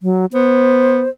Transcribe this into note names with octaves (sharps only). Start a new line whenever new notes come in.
F#3
B3 C5